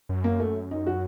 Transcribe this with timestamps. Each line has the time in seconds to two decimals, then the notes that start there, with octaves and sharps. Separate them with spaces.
0.09 F#2
0.24 A#3
0.40 A3
0.71 D#4
0.87 F#4